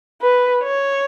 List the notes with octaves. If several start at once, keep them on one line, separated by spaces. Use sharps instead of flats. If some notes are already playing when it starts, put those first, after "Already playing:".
B4
C#5